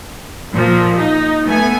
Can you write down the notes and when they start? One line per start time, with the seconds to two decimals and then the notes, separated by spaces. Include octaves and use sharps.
0.54 A#2 F3
0.99 D#4
1.46 A3 B3 G#5